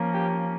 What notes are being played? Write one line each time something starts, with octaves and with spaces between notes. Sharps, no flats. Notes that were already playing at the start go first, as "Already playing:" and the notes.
Already playing: F3 A#3 C#4
G4